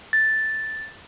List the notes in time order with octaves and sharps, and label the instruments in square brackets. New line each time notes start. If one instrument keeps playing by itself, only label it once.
[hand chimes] A6